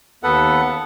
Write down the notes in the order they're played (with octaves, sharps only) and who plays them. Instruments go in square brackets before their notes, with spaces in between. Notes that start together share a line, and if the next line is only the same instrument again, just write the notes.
[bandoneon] D#2 B3 A4 B4 F#5